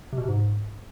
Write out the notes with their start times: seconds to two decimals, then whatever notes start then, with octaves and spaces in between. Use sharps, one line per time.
0.13 C3
0.18 B2
0.23 C3
0.28 G#2